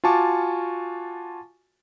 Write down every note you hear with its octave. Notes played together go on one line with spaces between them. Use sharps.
F4 F#4 G#5 A5 C#6 D6